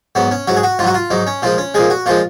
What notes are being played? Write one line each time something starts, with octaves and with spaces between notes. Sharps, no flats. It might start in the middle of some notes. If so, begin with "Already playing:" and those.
G#2 F#3 B3
C#4
G#2 F#3 F#4
G#4
F#4
G#2 F#3 F4 F#4
F4
G#2 F#3 D#4
C#4
A#2 F3 G#3 F4
C#4
A#2 F3 G#3 G#4
F#4
A#2 F3 G#3 F4